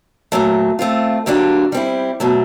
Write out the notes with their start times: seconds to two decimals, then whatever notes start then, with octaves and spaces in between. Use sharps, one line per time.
0.32 A#2 F#3 A3
0.79 A3 C4 F4
1.26 D3 F#3 A#3 D4 G4
1.72 G3 C4 E4
2.20 B2 F#3 A3